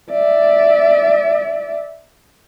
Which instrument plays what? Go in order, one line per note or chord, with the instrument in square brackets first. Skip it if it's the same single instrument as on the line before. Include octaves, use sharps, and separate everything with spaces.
[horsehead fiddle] D5 E5